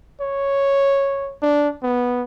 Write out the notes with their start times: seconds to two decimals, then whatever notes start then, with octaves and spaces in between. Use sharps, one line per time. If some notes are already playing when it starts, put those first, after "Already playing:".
0.21 C#5
1.42 D4
1.83 B3